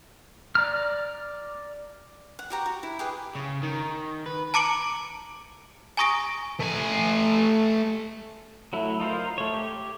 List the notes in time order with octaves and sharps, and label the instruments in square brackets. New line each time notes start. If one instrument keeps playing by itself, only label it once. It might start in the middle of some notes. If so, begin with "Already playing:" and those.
[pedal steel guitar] D5 A#5 F6
[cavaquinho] F#5
F#4 G4 A#5
F#4
E4
G4 G#4 B4
[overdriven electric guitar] C#3
D#3
B4
[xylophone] A5 A#5 D6 C#7 D7 F#7
G#5 A#5 C#6 D#6 A#6 D7
[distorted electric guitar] A3 G#5
[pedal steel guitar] F#3 A3 E4
D#4 F4 A#4 C5
A3 C#5
G4